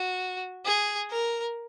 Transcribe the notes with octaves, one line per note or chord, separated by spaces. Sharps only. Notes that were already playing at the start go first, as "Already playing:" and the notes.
Already playing: F#4
G#4
A#4